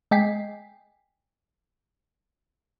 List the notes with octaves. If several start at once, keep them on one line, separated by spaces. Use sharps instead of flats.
G#3 D#5 G5 G#5 B6 C7